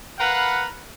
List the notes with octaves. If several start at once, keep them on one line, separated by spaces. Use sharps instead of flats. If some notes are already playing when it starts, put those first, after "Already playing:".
A#4 B4 F5 F#5 B5